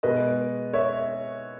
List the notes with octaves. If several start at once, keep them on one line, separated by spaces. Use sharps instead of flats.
B2 G#3 B4 D#5
C#5 E5